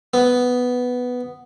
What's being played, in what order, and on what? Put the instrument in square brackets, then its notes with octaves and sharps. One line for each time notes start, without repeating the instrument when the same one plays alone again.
[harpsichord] B3